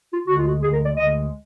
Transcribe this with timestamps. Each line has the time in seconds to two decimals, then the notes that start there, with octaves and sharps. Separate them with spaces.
0.10 F4
0.27 D2 D3 G#3 F#4
0.36 F4
0.45 F#4
0.62 D2 D3 G#3 G#4
0.73 A#4
0.84 D5
0.96 D2 D3 G#3 D#5